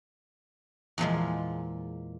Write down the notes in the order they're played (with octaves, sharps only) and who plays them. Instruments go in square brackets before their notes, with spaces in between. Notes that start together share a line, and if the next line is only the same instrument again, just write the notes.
[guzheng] E2 A#2 F3 G#3